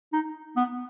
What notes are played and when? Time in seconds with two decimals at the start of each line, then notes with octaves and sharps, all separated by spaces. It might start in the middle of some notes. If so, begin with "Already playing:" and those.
0.12 D#4
0.56 B3